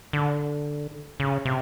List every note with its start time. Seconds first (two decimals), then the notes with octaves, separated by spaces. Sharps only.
0.13 D3
1.20 C#3
1.45 C3